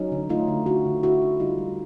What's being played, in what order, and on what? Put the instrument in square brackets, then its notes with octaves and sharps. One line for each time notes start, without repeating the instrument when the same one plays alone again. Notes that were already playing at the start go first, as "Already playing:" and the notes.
Already playing: [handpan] F#3 C#4 D#4
D3
A3 D#4 F4
D3
D3 E4 F#4
D3
D3 E4 F#4
D3
G3 D#4 F4
G3